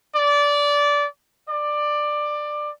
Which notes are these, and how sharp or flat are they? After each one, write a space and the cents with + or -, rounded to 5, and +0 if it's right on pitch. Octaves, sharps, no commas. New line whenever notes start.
D5 -20
D5 +15